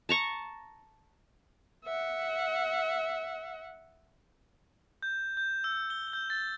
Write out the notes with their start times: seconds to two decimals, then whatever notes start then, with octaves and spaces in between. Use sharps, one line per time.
0.09 A5 A#5 C#6
1.85 E5 F#5
5.03 G6
5.37 G6
5.64 E6
5.90 G7
6.13 G6
6.30 A6